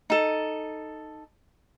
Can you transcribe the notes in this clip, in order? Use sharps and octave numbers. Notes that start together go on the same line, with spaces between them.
D#4 A4